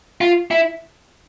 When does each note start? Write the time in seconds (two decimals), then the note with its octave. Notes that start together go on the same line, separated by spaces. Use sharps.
0.21 F4
0.51 E4